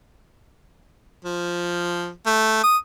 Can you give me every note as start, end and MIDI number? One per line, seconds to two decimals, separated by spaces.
1.25 2.09 53
2.26 2.62 57
2.63 2.77 87